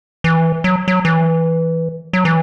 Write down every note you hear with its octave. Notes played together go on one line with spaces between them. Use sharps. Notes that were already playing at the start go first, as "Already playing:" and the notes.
E3
F#3
F#3
E3
F#3
E3